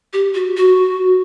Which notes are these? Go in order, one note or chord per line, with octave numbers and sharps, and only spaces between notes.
G4
F#4
F#4